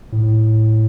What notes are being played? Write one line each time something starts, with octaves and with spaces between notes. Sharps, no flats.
A2